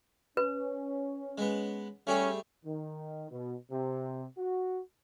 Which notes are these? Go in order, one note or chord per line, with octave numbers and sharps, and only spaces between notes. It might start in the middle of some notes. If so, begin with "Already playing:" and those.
C#4 B4
G#3 B3
G3 A3 C#4 G4 G#4
D#3
B2
C3
F#4